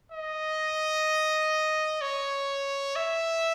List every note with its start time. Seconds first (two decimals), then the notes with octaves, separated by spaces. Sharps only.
0.12 D#5
2.02 C#5
2.96 E5